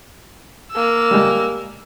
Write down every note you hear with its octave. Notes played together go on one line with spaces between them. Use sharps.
A#3 E6
G3 G#3